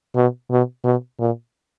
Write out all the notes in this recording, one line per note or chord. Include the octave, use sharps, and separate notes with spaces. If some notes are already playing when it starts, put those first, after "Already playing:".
B2
B2
B2
A#2